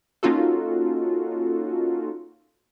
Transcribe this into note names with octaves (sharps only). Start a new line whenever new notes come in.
A#3 C#4 D#4 F4 F#4 A4